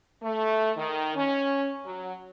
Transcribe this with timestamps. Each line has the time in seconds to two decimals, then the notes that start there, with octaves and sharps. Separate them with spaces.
0.22 A3
0.76 D#3
1.15 C#4
1.84 F#3